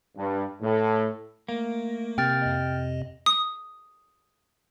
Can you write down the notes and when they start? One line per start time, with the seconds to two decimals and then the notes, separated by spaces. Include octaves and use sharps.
0.16 G2
0.61 A2
1.49 A3 A#3
2.18 C3 G5 F6 A6
2.42 F2 D#5
3.26 D#6